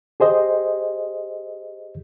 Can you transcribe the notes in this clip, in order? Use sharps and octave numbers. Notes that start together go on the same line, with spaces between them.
G4 G#4 C5 D#5